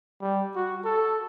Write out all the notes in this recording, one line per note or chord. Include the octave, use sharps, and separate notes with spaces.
G3
F#4
A4